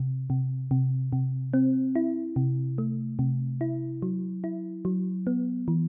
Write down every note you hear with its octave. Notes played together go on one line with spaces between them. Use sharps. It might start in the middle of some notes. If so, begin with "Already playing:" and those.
Already playing: C3
C3
C3
C3
C4
E4
C3
A3
C3
E4
F#3
E4
F#3
B3
E3